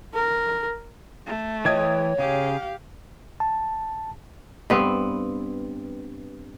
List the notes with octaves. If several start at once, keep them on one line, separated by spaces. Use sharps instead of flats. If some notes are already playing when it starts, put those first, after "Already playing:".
A#4
A3
E3 C#5 D#5 G5 D#6 G#6
C#3 G4 G#4 F5
A5
G2 B3 C4